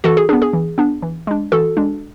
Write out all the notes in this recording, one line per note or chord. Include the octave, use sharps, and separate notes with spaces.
E3 F#4 A4
G#4
B3 D4 G#4
G#4
E3
B3 D4
E3
G#3 D4
E3 F#4 A4
G#3 D4